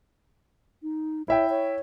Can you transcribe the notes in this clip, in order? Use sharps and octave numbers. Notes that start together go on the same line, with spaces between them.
D#4
E4 C#5 E5 G5
C#5